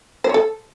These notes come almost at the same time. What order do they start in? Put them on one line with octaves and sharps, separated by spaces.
C5 C#5 A4